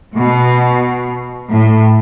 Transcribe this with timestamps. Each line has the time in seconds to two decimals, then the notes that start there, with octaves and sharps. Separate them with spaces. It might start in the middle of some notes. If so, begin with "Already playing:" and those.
0.16 B2
1.50 A2